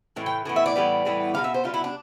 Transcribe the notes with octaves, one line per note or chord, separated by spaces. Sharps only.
A2 E3
G5
A2 E3 B3
E5
D5
A2 E3 G3 B3
A2 E3 G3 B3
B2 G3 B3 F5
E5
C5
B2 G3 B3 F4
E4
D4